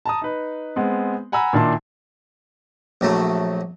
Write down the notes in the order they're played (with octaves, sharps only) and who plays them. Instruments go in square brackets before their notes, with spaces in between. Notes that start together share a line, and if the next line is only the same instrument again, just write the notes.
[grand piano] A5 A#5 D#6
D#4 B4
G#3 B3 C4
F#5 G#5 A#5 B5 E6
A#2 D#3 D4 E4 A5 C6
[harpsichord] A#1 F#3 A3 E4